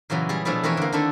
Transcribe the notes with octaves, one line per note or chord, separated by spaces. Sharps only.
A#2 C#3 E3 F#3 B3
G3 G#4
B2 F3 A3 D4 E4 G#4
E3 C4 A#4 B4 C#5 E5
D3 A#3
D3 D#3 A3 D4 E4 A4